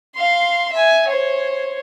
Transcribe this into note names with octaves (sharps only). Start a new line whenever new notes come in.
F5 C6
E5 G#5
C5 C#5